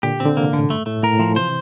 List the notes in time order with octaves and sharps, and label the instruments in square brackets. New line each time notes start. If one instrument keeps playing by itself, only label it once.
[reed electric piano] A#2 D3 [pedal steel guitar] G4
[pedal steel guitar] C4
[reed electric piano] D3
[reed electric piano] C3 E3 [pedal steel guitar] A#3
[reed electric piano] A2 [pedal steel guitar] D3
[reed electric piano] G2 [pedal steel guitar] A3
[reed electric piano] A2 [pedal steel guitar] A3
[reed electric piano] A2 [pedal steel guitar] A#4
[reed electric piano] A#2
[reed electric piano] A2 [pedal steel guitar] F3
[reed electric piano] C3 E3 [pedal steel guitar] C5